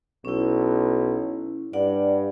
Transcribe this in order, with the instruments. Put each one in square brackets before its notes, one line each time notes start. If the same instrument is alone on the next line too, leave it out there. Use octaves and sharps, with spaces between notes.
[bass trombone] B1 [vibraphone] C#4 E4
[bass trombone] G2 [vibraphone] D5 F#5